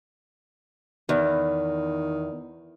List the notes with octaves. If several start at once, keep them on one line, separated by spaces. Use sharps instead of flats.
E2 D#3